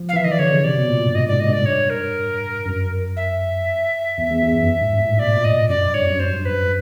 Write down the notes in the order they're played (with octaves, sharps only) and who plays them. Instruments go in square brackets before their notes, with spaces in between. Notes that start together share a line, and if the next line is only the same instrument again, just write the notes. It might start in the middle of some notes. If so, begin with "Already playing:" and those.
Already playing: [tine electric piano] F3
[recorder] F5
[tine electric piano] E3
[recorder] E5
[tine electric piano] D#3 [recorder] D#5
[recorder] D5
[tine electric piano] D3 [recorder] C#5
[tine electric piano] C#3
[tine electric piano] C3 [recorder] D5
[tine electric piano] B2
A#2
G2
[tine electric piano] G#2 [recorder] D#5
[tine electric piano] G#2 [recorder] D5
[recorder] D#5
[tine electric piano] G2 [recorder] D5
[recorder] C#5
A#4
[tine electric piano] F#2
[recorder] E5
[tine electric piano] E2
E2
E2
F2
F#2
G#2
G2
A2
[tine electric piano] B2 [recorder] D5
[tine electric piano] A#2
[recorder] D#5
[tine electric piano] F#2 [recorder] D5
[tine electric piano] F2
[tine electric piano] G2 [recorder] C#5
[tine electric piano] F#2
[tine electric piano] G2 [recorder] C5
[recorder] B4